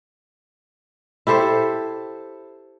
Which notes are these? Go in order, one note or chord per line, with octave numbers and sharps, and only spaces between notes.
E4 G4 A4 C5